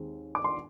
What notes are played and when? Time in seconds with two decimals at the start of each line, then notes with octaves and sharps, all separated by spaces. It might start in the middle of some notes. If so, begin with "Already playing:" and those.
Already playing: D#2 D#3 G#3 C4
0.35 D6
0.44 C6